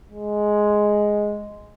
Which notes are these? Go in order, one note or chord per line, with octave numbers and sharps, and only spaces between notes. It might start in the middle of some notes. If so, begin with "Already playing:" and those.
G#3